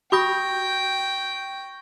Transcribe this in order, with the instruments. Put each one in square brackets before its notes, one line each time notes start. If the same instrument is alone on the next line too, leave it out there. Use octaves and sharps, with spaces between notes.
[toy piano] F#4 B5 D#6 [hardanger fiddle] G5 [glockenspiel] C#6 G6 A#6